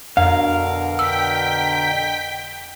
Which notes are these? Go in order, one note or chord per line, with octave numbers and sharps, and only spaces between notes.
F2 B2 D3 A#4 F5
G5 E6 B6